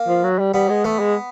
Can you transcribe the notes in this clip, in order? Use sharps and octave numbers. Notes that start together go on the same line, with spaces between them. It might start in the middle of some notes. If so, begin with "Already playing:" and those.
Already playing: A#3
F3
F#3
G3
G3 B3
G#3
A3 B3
G#3